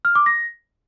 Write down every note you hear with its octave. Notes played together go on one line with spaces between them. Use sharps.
F6
D6
A#6